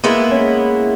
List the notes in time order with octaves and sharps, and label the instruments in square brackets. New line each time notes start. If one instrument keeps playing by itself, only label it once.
[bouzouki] G#3 B3 E4 [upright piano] A#3
[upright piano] C#4